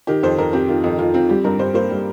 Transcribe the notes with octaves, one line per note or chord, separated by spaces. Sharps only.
D#3 G4
F2 C5
F2 A#4
C4 G4
D#3 F4
F2 D#4
F2 F4
C4 F4
G3 G4
G2 A#4
G2 C5
A#3 C5
G3